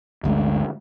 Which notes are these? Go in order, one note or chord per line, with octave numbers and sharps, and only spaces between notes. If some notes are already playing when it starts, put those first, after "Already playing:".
G1 D2 C3 G#3